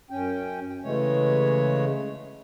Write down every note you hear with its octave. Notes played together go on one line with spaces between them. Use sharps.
F#2 C#4 G5
C#3 E3 G#3 A3 C#5